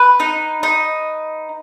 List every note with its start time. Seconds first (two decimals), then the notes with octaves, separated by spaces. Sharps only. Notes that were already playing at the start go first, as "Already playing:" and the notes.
Already playing: B4
0.20 D#4
0.63 D#4